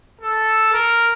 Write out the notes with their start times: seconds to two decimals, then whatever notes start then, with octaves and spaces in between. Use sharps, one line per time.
0.21 A4
0.74 A#4